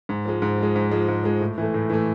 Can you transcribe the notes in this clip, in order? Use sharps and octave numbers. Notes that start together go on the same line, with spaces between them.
G#2
F3 G#3
G#2
F3 G#3
G#2
F3 G#3
G#2
F3 G#3
A2
E3 A3
A2
E3 A3